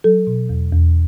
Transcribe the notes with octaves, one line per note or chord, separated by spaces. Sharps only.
F#3 A4
B2
E2
E2